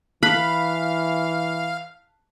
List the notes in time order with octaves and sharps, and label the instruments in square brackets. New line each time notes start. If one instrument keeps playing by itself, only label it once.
[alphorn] E3 [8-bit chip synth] F5 [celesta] A5 F#6 B6 [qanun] B5